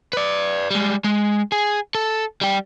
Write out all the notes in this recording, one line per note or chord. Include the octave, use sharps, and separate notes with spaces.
B4 D5
G3 G#3
G#3
G#4
A4
G3 G4